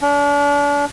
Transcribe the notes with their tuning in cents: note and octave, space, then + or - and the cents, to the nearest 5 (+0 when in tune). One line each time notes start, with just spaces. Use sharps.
D4 -35